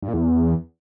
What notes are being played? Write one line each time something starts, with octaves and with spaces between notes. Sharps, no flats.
G2
A#2
E2